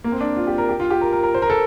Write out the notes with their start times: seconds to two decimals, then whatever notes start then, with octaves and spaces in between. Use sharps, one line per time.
0.04 A#3
0.12 C4
0.21 D4
0.37 F4
0.47 G4
0.58 A#4
0.69 G4
0.80 F4
0.90 G4
1.01 A#4
1.12 A#4
1.23 A#4
1.34 C5
1.42 A#4
1.50 A4